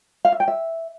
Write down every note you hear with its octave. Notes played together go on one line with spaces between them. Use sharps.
F5
E5
G5
E5